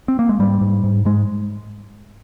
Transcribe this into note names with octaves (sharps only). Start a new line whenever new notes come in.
C4
A#3
G#3
G#2 G3
G#2
G#2
G#2 G#3